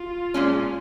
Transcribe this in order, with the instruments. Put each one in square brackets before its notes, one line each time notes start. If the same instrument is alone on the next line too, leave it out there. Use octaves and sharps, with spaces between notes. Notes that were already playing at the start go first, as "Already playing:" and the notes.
Already playing: [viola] F4
[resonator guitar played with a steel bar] A#2 G#3 C#4